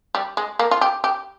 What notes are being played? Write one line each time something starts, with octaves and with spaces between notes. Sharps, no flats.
G3
G#3
A#3
F4
G4
G4